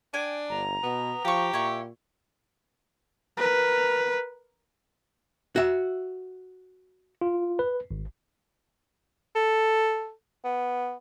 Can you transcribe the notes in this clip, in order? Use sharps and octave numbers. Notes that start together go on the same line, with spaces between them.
D4 G5 G#5
G1 A#5
B2 B3
F3 G4 F5 C#6
A#2 E4 C#6
A#4 B4
F#4 E5
F4
B4
G#1
A4
B3